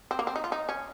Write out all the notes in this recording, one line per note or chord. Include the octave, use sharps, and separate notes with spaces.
C4
A#3
C4
D#4
F4
D#4
C#4